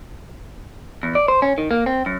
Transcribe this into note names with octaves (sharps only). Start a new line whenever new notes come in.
E2
D5
C5
C#4
D#3
A#3
C4
F#2